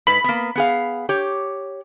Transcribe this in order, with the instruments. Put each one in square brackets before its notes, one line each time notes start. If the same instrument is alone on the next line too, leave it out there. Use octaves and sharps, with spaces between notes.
[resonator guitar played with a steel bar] G#2 B4 [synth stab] B5
[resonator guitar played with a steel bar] A#3 B3
B3 G#4 F5
G4 C#5